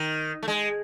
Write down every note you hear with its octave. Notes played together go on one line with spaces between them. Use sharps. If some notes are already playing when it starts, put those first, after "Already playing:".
Already playing: D#3
A3
G#3